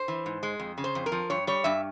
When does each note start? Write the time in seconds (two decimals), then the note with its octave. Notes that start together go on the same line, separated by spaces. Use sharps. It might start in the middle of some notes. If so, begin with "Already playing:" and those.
Already playing: C5
0.08 E3
0.26 G#2
0.43 G#3
0.60 F2
0.78 C#3
0.84 C5
0.95 F2
1.06 A#4
1.12 F3
1.30 G2 C#5
1.47 G3 C#5
1.64 G2 E5